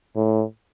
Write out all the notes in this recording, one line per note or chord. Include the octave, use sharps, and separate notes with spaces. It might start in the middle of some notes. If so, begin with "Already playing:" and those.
A2